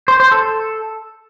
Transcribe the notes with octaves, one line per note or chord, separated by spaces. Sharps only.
C5
C5
A4